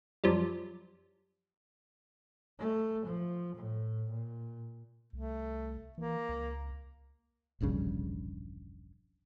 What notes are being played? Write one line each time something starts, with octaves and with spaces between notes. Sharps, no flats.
F#2 F3 G3
A3
F3
A2
A#2
C2 A3
E3 A#3
C#2
E1 A#1 G2 C#3